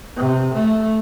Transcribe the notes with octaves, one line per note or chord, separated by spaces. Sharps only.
C3
A3